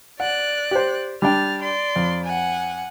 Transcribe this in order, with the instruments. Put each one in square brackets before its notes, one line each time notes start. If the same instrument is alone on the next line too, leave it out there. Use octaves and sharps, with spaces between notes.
[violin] D5 F#6 [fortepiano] F#5
[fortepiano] G4 C5
[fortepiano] G3 D4 G5 [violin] F6 A6
[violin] D5 C6
[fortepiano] F2
[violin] F#5 G#5